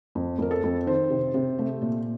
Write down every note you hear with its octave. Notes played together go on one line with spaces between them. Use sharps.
F2
F2 A#4
A4
F2
D#3 C5
C3
C3
A3
A#2